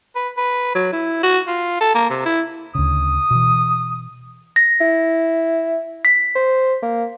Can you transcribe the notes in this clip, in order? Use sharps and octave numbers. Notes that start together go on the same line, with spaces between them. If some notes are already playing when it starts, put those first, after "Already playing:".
B4
B4
F#3
E4
F#4
F4
A4
A#3
C3
E4
D2 C#3 D#6
B2 E3
A#6
E4
B6
C5
A#3